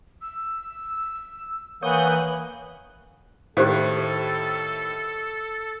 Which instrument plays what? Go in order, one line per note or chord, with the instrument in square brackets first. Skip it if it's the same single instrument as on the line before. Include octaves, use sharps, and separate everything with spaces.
[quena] E6
[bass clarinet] E3 [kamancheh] A#3 F#6 [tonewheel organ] C#5 D#6 G6 [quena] F#5
[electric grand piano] A2 D#3 E4 [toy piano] G4 C5 F5 [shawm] A4